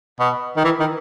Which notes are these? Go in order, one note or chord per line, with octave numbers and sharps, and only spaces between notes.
B2
D#3
E3
D#3